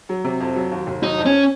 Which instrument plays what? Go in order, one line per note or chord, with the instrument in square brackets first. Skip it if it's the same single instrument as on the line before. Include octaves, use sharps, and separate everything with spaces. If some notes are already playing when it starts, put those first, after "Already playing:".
[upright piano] F#3
C3
F2
F#3
D#2
F1
[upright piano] F#3 [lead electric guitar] D#4
[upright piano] F2
[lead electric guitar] C#4